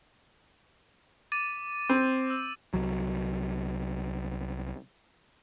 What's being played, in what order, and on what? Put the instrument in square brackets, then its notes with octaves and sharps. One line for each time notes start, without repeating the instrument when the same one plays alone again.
[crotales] D6 A6 D#7
[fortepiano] C4
[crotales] E6
[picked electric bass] C2 F#3